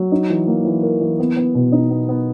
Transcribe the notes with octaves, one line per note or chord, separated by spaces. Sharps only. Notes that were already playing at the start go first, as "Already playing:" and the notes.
Already playing: F#3
D#4
E3
A#3
E3
A#4
E3
B3
B3
B2
D#4
B3
B3